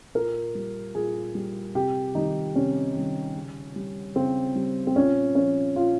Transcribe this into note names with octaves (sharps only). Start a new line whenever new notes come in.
A#2 A#4
G3
A#2 G#4
G3
C3 G4
D#3 G3 D#4
C3 C#4
D#3 G3
C#3
G3
C#3 C4
G3
C4
A#2 C#4
F3 C#4
A#2 F4